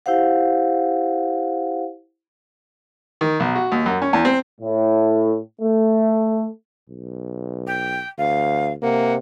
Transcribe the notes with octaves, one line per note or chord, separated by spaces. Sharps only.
E4 G4 C5 F5 F#5
D#3
B1
F#4
D#2
F#2
C#4
E2
C4
A2
A3
B1
G5
D2 F5
C3 A#3 F#5